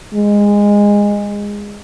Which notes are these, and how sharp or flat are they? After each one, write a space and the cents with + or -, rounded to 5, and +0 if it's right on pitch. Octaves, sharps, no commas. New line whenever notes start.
G#3 -20